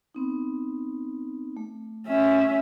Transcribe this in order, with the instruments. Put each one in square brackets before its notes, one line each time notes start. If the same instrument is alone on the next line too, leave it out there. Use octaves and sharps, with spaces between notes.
[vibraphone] B3 C4 D#4
A3
[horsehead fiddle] C#4 E5